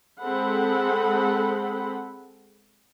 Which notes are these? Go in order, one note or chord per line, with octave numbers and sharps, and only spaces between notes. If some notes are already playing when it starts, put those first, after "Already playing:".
G#3 C4 G#4 A4 F#5 B5